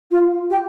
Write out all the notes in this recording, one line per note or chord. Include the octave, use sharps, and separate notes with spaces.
F4
G4